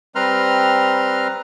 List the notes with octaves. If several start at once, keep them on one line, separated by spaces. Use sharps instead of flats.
G3 C4 B4 A#5 C6 F6